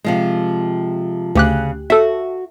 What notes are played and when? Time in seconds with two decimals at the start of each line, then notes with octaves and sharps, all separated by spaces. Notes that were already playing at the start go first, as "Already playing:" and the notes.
0.04 C3 F3 G#3
1.35 D2 C#3 G4 F#6
1.90 F#4 A4 E5